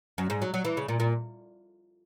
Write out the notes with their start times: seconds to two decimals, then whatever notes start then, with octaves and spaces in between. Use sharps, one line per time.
0.18 F#2
0.30 G#2
0.42 F#3
0.54 F#3
0.65 E3
0.77 C#3
0.88 A#2
1.00 A#2